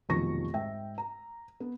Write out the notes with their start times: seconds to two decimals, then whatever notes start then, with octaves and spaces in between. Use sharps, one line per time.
0.09 F1 B1 D#3 F3 C#6 A#6
0.53 G#2 E5 G5
0.98 A#5
1.60 B3